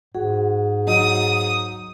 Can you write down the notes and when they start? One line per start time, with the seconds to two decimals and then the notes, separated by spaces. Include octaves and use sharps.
0.15 G#2 F#4 G#4
0.87 F#3 D#4 D#6